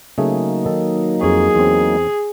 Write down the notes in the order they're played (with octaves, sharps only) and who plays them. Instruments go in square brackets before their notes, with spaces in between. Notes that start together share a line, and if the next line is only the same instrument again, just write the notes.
[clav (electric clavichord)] C#3 A3 G#4 [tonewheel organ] F#3 A#3 D#4
[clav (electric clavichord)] D#3 A4
[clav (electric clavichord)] F2 C#5 [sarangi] G#4
[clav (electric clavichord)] E2 C4